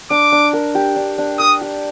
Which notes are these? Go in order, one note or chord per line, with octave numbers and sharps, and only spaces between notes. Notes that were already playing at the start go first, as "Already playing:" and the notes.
D4 D6
D4
A#4
G4
D4
D4
A#4 D#6
G4